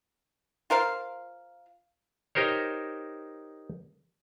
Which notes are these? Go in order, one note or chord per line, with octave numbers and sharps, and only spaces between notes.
F4 A#4 C5 F5
D#4 G4 A#4 C5 C#5